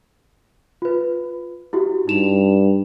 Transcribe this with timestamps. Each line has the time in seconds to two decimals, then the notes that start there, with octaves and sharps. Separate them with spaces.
0.82 F4 B4
1.73 E4 F#4 G4
2.08 G2 D#4 E7 F7